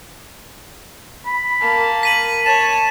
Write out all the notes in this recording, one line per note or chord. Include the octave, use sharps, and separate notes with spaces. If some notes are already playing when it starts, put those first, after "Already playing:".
B5
A#3 A5
B6 D#7 F#7
C#5 A5 E7